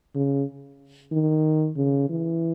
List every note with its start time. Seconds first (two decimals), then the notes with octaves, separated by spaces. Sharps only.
0.15 C#3
1.13 D#3
1.77 C#3
2.10 E3